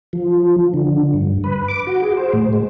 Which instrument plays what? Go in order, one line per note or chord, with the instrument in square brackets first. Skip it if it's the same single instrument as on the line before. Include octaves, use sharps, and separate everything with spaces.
[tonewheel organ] F3
D3
G2
B4
D6
F#4
G#4
C5
A2
G#3